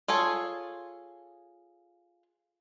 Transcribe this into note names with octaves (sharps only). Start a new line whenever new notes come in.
F4 G#4 A4 C#5